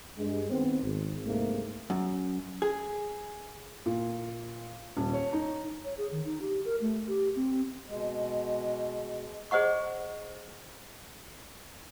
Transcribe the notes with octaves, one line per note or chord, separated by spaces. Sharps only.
G2 G#3
D#3 B3 C4
G#1
C2 G#2 A3 A#3
F#2
G#4
A#2
D#1
C#5
D#4
C#5
G#4
D#3
D#4
G4
A#4
A3
G4
C4
B2 G#3
G#4 C5 D#5 F#5 C#6